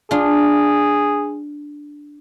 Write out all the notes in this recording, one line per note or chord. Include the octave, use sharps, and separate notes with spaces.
D4 F4 G#4